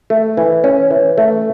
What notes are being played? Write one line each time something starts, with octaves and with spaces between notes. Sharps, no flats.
A3
E3
C#4
E3
A3